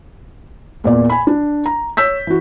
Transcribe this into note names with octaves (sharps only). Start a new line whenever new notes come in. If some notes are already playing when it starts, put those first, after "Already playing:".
E2 A#2 D5
G#5 B5
D4
A#5
C#5 E6 G6 B6
E3 F#4